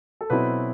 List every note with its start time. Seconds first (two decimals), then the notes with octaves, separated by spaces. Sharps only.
0.21 A4
0.30 B2 F#3 C4 E4 B4